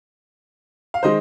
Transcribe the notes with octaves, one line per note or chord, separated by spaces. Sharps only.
F5
D#3 G#3 C5 D#5